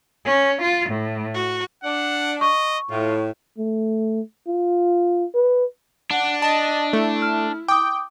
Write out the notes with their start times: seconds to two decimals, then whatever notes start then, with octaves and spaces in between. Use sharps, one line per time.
0.25 C#4
0.62 F4
0.91 A2
1.34 F#4
1.84 D4 F#5
2.41 D#5 C#6
2.91 A2 F4
3.58 A3
4.47 F4
5.34 B4
6.11 D4 F#5
6.42 D#5 A5
6.93 A3 E4
7.22 F6
7.68 G5 D6 D#6